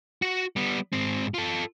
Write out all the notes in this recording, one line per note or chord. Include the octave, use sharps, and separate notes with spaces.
F#4 F#5
G3 B3
G#2 C4
F4 A4